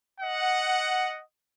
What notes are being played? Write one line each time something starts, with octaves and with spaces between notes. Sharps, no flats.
D#5 F#5